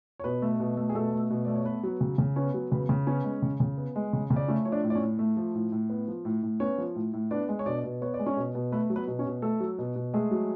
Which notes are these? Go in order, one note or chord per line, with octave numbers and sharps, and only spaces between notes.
C#5
B2 B3 B4
A3
B2
A3
G#4
B2 A3 A4
A3
B2
A3 D5
C#5
B3 B4
F#3
C#3
C#3
B3 C#4 C#5
F#3
C#3 B3 B4
C#3
B3 C#4 C#5
G#3
C#3
C#3
B3
G#3
C#3
C#3
D5
A3 C#4 C#5
F3 C#5
D4 D5
A2
D5
C#4 C#5
A2
A3
F3
A2
A2
B3
F3
A2
A2
B3 C#4 C#5
F3
A2
A2
B3 D4 D5
G#3
C#5
B2 D4 D5
B2
B3 C#5
D5
G#3
C#4 C#5
B2
B2
A3 B3 B4
F#3
B3 B4
B2
C#4 C#5
B2
A3 A4
F#3
B2
B2
G#3 A3 G#4
F#3